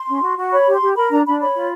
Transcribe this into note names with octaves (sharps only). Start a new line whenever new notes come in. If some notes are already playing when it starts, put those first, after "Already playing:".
Already playing: C6
C#4
F#4
F#4
C#5 B5
G4
C6
G4
A#4 B5
D4 A#5
D4 B5
C#5 B5
F4